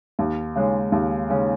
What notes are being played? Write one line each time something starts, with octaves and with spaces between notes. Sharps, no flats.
D#2
C#3 G#3 C#4
D#2
C#3 G#3 C#4